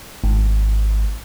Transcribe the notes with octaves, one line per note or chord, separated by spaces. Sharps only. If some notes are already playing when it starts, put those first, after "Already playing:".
G#1